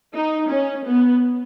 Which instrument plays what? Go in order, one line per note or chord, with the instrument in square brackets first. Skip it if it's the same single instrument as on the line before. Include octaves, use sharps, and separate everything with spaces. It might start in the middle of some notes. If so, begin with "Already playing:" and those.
[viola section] D#4
C#4
B3